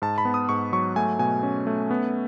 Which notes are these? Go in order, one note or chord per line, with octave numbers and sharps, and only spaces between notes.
G#2 A5
B5
B3
D#6
G#2 C#6
F#3 C#6
A3 G#5
B2 G#5
C#4
A3
B3